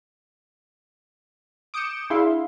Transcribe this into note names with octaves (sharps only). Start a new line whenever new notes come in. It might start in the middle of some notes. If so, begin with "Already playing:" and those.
D6 D#6 G6 C#7 D7 E7
D4 E4 G#4 E5 F5 C6